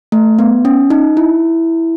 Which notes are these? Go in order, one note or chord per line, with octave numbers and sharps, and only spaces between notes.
A3
B3
C#4
D#4
E4